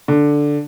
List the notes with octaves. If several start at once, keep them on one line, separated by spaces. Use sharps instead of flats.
D3